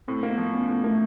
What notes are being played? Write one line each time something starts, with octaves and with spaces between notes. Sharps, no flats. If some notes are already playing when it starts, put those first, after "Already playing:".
A2 C4
A#3
B3
F3
B3 C#4
A2 B3
A3 A#3